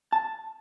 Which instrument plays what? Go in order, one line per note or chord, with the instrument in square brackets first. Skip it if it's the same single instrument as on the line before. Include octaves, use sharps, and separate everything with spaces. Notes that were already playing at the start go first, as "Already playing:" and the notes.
[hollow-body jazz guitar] A5